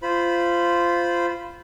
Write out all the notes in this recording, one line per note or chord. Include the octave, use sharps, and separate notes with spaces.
F4 C5 B5